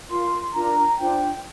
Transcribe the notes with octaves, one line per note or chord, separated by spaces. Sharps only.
F4 A#4 C6
D4 F4 A#4 A#5
D4 F4 C5 G5